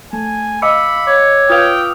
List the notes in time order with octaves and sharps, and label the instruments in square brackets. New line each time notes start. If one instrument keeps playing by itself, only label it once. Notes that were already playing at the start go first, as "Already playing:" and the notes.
[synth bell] A3 [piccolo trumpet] G#5
[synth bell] D#5 F5 [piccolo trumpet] B5 [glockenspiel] D6 E6 C#7
[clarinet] C#5 [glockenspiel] D6
[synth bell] F4 B4 F5 [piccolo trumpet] G5 [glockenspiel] D#6 F6 F7